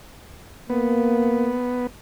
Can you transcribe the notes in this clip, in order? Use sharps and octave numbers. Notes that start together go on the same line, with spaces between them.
A#3 B3